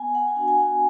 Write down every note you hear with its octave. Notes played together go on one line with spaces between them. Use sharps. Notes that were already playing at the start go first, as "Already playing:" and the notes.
Already playing: B3 G#5
F#5
G#5
D4 F#4 F#5
G#5
F#5